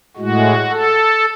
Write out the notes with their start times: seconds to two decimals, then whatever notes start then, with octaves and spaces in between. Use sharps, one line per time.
0.17 A2 G#3 F#4
0.70 A4